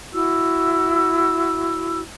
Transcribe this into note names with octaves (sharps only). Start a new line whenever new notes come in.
E4 F#4 E6